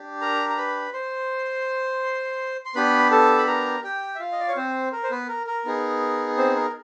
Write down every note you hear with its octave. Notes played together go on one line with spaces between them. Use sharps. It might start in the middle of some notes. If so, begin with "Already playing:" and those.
Already playing: D4 G4
A#4 A#5
A#5
B4 B5
C5 C6
C6
B3 D4 G4 B4 B5
A4 A5
B5
A#4 A#5
G4 G5
E5
F4 F5
D#5
D5
C#5
C4 C5
A#4
C5
B3 B4
A#4
A#4
B3 D#4 G#4
C4 C5
A#4